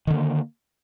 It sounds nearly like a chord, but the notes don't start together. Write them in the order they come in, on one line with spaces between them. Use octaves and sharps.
D#3 D3 A#3